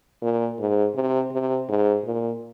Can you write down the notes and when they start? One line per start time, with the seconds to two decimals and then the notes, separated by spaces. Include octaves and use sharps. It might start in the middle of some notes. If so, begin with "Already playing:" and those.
0.23 A#2
0.59 G#2
0.95 C3
1.32 C3
1.69 G#2
2.05 A#2